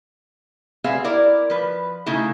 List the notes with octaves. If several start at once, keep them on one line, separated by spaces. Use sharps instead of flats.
B3 C4 G#4 E5 F5
E4 A#4 D5
F3 B4
C#3 A3 D#4 E4 A4